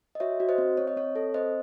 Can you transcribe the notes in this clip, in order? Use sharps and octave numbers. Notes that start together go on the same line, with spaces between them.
D#5
F#4 C#5 E5
F#4
C5 D#5
C4
C4 C#5
D#5
C4 C#5
A4
C4 C5 D#5